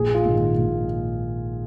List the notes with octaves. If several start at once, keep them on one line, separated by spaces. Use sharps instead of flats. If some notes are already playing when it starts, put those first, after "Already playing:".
Already playing: A#1 G#4
F4
G#2 D#3
A#1